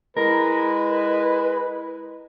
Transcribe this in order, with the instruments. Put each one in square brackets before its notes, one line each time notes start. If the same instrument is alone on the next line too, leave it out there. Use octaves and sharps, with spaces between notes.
[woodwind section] G#3 E4 [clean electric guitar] A#4 [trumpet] B4